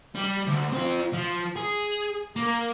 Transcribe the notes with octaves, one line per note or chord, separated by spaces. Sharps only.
G3
D2
C4 F4
F3
G#4
A#3